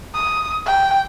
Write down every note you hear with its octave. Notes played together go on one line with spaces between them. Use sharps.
D#6
G5